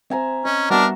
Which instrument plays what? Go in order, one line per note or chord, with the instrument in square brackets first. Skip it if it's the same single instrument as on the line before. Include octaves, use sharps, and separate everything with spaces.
[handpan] C4 C5 [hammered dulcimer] E5 G#5 A#5
[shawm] C#4 [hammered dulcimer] D#5
[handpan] G3 B3 [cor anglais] D4 [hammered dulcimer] F#4 E5 [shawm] A#4